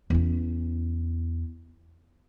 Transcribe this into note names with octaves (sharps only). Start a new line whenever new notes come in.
E2 C#4